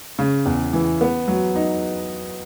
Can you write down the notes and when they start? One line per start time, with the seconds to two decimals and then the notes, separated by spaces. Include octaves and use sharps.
0.19 C#3
0.46 E2
0.73 E3
1.01 B3
1.28 F#3
1.55 D#4